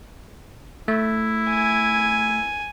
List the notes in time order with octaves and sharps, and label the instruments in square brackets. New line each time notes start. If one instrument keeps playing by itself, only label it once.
[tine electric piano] A3 [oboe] E4
[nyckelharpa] G#5